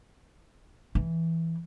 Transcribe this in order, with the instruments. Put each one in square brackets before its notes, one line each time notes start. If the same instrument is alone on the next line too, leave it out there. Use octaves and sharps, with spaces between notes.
[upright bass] E3